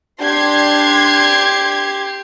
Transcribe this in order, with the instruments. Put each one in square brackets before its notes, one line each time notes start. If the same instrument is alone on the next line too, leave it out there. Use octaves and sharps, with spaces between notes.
[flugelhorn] D4 [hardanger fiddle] G4 [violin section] C6 G#6